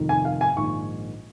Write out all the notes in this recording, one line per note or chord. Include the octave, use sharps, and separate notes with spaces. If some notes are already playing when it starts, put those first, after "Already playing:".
Already playing: F1 F2 D#3
G#5
F5
G#5
A#1 G#2 D#3 C#6